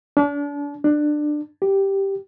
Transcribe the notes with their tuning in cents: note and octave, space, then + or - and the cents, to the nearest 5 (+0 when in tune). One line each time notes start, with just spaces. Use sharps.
D4 -35
D4 +20
G4 +0